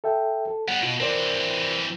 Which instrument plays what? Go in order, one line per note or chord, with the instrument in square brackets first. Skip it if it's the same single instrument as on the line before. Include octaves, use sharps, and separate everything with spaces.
[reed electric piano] A4 E5 G5
A4
[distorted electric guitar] G3 B3 [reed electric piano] F#5
[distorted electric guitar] B2 [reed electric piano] F4
[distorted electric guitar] E3 C4 [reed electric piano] A#4 C5 D5